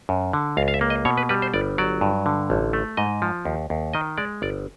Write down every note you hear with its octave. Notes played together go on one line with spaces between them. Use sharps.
F#2
D3
C#2 F5
F5
E5
A#3
D#5
B2 C#5
B4
G3 B4
C5
G1 D5
F#3 D5
G2
D3
A1
A3
G#2 D#5
F3
D#2
D#2
D#3 D#5
G#3 D5
G1 D5